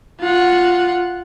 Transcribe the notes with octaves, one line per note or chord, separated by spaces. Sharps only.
F4 F#5